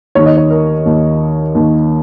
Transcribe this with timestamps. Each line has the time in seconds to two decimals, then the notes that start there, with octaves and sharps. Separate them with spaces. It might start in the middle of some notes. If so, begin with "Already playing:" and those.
0.15 D#2 D#3 C#5
0.26 D#5
0.37 C#5
0.51 A#4
0.85 D#2 D#3
1.55 D#2 D#3